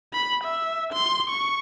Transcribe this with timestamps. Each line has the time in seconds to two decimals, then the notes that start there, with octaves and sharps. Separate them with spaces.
0.13 B5
0.44 E5
0.93 C6
1.30 C#6